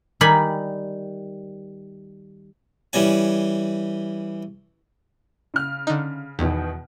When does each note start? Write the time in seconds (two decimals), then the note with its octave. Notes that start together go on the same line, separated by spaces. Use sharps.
0.21 D#3 G3 D5 G#5 B5
2.93 E3 G3 C#4 G#5
5.54 C#3 F6
5.87 D3 D#4
6.39 E2 B2 D#3